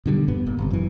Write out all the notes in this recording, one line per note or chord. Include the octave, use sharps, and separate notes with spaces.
B2 D3 G3
E1 G2 B3
D#1 A#2 A#3
G1 C3
F#2 E3